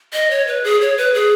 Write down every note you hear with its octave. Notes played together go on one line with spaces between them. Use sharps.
D#5
C#5
B4
G#4
C#5
B4
G#4